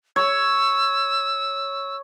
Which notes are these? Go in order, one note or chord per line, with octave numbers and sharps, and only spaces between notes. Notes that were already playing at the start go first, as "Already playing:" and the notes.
C#5 E6